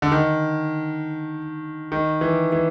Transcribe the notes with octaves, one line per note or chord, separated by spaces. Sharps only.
D3
D#3
D#3
E3
E3